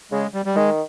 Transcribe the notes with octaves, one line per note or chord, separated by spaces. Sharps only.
C#3 G#3
G3
G3
D#3 G#3